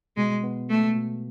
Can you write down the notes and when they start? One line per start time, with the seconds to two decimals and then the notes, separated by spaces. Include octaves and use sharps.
0.17 B2 G#3
0.44 B3
0.70 G#3 A3
0.96 B2